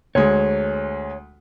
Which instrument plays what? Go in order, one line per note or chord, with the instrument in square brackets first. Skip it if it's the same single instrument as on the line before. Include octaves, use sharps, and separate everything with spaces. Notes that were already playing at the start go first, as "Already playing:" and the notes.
[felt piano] D2 G#3 [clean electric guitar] C#5